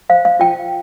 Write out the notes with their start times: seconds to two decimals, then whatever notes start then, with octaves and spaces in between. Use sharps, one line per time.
0.09 C5 F5
0.25 F5
0.40 F4 G5